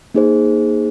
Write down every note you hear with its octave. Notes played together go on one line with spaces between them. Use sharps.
A#3 D#4 G#4 C5